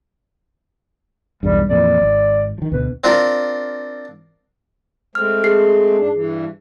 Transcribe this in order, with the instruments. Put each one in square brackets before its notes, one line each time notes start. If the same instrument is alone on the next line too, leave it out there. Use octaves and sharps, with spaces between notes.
[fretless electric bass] B1 E2 G2 [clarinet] G3
[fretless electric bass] F2 A#2 E3 [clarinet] D5
[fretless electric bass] G#1
D#3 F3
[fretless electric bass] D2 B2 [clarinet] B4
[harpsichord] C4 D4 F4 A#4
[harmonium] G#3 A3 C4 [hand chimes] F6
[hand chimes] G#4 C7
[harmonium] G#2 D4
G2 E3